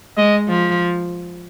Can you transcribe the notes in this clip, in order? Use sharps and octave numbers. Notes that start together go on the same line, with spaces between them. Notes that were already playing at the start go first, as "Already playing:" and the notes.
G#3 D#5
F3